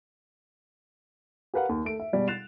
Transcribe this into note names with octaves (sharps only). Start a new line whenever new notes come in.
G4 A#4 B4 F5 F#5
D#2
A3 D7
E5
B2 G3 G#3
F#6 A6 C7 E7 F7